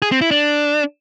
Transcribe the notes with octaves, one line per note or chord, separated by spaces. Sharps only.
G#4
C4
E4
D4